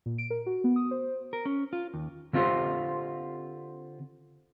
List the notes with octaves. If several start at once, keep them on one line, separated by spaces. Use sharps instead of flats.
A#2
D7
A#4
F#4
B3
D#6
C5
A#4
C#4
F4
D#2
D3 C4 F4 G4 C5